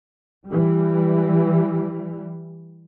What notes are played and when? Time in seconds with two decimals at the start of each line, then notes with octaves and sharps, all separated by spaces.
0.47 E3 G3